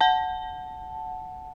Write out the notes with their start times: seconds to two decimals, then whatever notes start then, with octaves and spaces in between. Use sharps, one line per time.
0.01 F#5 A5